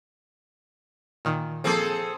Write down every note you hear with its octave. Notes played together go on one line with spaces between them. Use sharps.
A#2 D#3
F3 A#3 C4 G#4 A4